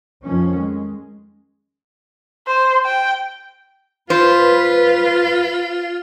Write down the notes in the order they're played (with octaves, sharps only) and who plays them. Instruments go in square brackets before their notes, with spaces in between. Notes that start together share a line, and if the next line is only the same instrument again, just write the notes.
[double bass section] F2 D#3 F3 C#4
G#3
[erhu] C5
G5
[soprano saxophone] F4 [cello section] B4 [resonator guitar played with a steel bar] C5